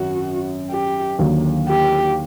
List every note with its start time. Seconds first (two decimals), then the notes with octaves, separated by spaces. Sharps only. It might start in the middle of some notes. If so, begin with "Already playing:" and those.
Already playing: G#1 F#2 F#4
0.70 G4
1.19 D#2 D3 F#3 A#3
1.68 G4